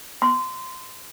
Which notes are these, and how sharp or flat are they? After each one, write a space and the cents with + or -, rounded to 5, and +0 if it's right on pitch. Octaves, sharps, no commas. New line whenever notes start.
C6 -20